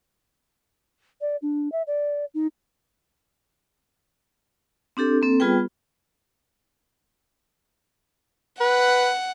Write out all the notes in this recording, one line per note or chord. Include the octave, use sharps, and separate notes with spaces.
D5
D4
E5
D5
D#4
C4 D4 G4 A4
A#3 C4 A4
G3 B3 F4 G#4 B4 G5
B4 F#5